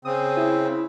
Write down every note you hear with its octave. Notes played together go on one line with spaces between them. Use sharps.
C#3 C4 D#6
E4